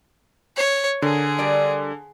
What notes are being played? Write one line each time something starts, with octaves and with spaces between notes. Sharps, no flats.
C#5
D3 G#4 A#4
G3 A#4 D5